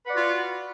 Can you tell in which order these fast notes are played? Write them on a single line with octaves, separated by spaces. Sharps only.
B4 F#5 D5 F#4 F4